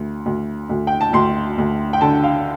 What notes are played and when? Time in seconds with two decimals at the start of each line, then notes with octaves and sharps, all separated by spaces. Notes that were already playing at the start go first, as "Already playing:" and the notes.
Already playing: D2
0.26 D2
0.70 D2
0.87 G5
1.01 A5
1.13 D2 C6
1.58 D2
1.93 G5
2.01 D3 A5
2.24 F5